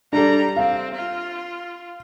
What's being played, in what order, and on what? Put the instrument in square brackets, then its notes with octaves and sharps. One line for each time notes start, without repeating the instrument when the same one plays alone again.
[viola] G3 A#5 [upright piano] D4 A4
[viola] C4 [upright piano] F5
[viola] F4